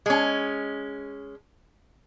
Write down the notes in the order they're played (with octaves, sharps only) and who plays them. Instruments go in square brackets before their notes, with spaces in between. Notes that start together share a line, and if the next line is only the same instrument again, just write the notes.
[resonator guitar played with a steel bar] G#3 C#4